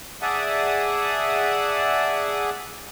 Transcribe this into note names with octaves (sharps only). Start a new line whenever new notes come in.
G#4 D5 E5 F#5 A5 D#6